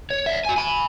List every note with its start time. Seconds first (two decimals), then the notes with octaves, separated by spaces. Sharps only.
0.11 C#5
0.26 D5 E5
0.45 F#4 G#5
0.56 G#5 B5